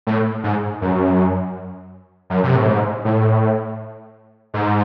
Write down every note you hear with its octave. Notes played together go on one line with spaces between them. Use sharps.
A2
G#2
F#2
F#2
C3
A2
G#2
A2
G#2